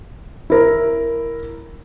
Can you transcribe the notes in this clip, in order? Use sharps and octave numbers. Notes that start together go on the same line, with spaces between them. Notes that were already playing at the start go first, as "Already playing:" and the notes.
E4 A#4